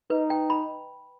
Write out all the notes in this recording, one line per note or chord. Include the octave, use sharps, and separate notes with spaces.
D#4 B4
G5
B5